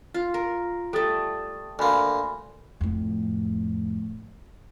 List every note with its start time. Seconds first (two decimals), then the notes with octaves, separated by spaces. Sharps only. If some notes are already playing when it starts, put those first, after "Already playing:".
0.14 F4
0.34 A#4
0.93 G3 A3 A4 D#6 A6
1.79 D2 A#3 G#5 B5 C6
2.81 F2 A2